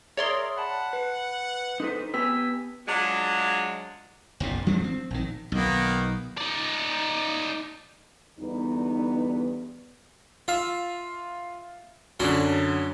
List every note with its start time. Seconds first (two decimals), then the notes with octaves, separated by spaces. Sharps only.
0.17 G#4 A#4 C#5 D5 E5 C6
0.58 F#5 A5 B5
0.93 B4
1.80 D#4 A4 B4 C5
2.14 B3 G4 B4 G#5 E6
2.87 F#3 G#3 D4 F4 F#4
4.40 F#1 B1 A#2
4.67 F3 G3 C4 D4
4.84 C4
5.11 A#1 D#3
5.52 B1 D#3 A#3 B3
6.38 D#4 D5
8.39 E2 D3 G3 B3 D#4
10.48 F4 E5 F5
12.20 F#2 D3 F#3 C#4 D4